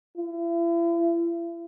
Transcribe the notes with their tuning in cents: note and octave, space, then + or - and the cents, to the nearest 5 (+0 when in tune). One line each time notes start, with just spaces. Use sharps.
E4 +40